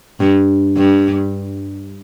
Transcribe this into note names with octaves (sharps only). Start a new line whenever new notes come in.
G2
G2